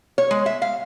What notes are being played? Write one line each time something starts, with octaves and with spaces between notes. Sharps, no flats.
C#5
G#3
E5
F5